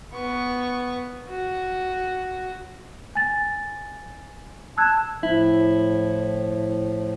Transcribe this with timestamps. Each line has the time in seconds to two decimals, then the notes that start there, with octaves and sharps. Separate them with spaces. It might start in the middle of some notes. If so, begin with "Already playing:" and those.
0.13 B3 C#6
1.29 F#4
3.15 G#5 A6
4.78 A5 E6 F#6 G#6
5.23 A2 F3 E4